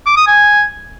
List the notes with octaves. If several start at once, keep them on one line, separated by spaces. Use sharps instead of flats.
D6
D#6
G#5